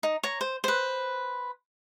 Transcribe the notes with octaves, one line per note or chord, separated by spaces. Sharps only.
D#4
C#5 A#5
C5
B4 C5